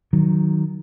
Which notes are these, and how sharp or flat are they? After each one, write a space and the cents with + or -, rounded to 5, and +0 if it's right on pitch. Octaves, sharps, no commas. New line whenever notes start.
D#3 +0 F#3 +0